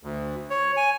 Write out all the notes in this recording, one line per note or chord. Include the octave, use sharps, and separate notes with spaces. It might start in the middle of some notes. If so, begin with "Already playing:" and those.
D2
C#5
G#5